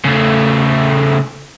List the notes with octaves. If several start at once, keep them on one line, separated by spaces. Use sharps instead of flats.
C#3 A3